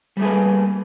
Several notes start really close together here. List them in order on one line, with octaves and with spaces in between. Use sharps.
G3 A3 G#4 B4 A#3